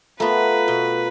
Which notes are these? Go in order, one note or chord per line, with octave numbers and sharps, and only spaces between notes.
A3 B3 F4 A#4 B4
B2